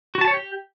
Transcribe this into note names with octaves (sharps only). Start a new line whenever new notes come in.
F#4
A5
C#5
G4